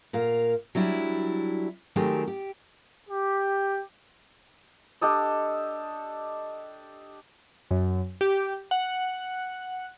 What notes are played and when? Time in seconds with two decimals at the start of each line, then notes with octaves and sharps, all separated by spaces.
0.13 A#2 A#4 F5
0.75 F#3 G3 D4 E4
1.96 D#3 F#3 G#3 A3 C4 G4
2.27 G4
3.08 G4
5.01 D4 G4 A4 D#5
7.71 F#2
8.21 G4
8.71 F#5